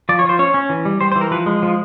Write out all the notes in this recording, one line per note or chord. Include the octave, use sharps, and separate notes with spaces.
F3 D5
C#5
F3 C5
C#4 C#5
C#4
E3
G3
G3 C5
C5
E3
A#4
F3 B4
G#3
F3